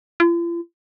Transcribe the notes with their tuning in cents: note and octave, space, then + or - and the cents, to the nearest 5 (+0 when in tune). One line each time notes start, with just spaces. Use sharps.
F4 -45